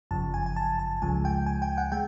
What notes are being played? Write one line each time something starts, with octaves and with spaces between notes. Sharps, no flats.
G1 F#2 C#3 F3 A5
G#5
G#5
A5
A5
C#2 C#3 F3 G#3 G#5
G5
G#5
G5
F#5
G#3 G5